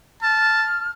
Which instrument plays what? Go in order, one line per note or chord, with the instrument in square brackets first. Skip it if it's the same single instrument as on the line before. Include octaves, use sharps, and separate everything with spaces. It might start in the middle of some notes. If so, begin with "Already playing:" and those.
[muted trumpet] A5 [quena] F6